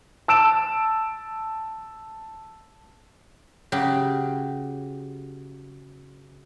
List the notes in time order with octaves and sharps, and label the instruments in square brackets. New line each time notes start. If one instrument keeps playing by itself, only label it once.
[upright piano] A5 E6 D7 E7
[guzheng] C#3 F#3 G4